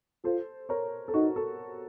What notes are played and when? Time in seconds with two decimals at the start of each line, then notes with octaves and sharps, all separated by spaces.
0.24 F4 A4 C5
0.69 A#4 C#5
1.08 A4
1.14 D#4 F#4
1.36 A4